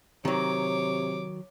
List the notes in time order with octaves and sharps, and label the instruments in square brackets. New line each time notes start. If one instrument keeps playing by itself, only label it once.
[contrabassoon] C3 [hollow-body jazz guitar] D#3 F#3 [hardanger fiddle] C#5 D6